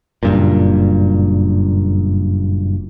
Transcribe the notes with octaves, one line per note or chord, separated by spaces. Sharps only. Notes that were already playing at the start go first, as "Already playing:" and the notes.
F#1 G2 A#2